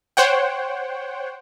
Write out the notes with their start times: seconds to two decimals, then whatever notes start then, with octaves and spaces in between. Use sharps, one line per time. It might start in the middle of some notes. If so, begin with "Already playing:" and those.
0.17 C5 C#5 F#5 G5